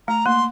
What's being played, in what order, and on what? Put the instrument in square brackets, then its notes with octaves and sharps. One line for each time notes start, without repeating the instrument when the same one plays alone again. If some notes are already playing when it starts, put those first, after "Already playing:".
[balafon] A3 [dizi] A#5
[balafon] A#3 [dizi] C6